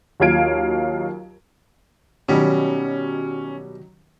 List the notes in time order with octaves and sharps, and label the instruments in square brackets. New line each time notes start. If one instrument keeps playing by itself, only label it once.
[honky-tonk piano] D#2 F#3 F4 F5 G#6 D7
[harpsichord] B2 G3 [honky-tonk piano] D#3 F#3 [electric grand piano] C#4